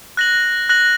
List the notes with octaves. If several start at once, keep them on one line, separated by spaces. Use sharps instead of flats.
F#6 A#6 F#7
F#6 A#6 F#7